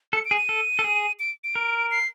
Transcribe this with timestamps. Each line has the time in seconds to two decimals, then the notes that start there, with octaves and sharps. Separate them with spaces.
0.13 A4 C#7
0.25 D7
0.31 G#4
0.37 D#7
0.49 A4
0.79 A4
0.84 G#4
1.20 D7
1.44 D7
1.55 A#4
1.91 C7